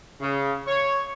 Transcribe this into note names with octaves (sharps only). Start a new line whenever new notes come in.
C#3
C#5